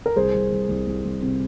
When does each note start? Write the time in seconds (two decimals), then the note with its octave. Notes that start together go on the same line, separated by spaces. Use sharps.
0.06 A#4
0.16 C2 G#4 C5
0.34 C2
0.52 C2
0.69 C2
0.87 C2
1.05 C2
1.22 C3